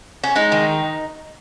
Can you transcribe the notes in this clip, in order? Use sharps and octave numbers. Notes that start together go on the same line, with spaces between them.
C#4
G#3 D#4
D#3